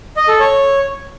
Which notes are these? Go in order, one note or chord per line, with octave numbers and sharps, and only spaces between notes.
D#5
A4
C#5